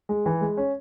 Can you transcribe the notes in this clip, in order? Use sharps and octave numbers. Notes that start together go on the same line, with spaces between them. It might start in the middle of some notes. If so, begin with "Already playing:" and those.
G#3
E3
G#3
C#4